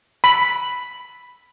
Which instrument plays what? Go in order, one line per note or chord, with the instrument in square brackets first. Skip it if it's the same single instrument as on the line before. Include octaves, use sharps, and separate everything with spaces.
[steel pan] B5